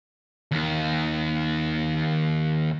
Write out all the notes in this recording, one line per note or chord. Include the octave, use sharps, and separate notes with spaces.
D#2 D#3